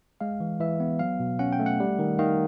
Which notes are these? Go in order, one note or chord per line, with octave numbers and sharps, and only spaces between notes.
G#3 F5
E3
E3 E5
B3
F#3 F5
B2
C#4 F#5
G5
A3
F#5
G3
D#3
D#3 F5